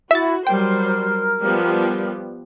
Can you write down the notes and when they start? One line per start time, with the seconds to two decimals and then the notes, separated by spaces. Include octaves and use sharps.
0.11 E4 F#4 E5 A6
0.47 F#3 G3 A#4 C5 G5
1.41 F3 G3 B3